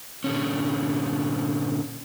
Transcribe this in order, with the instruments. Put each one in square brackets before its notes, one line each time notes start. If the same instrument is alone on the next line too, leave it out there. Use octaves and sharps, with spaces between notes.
[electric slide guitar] A#2 D3 C#4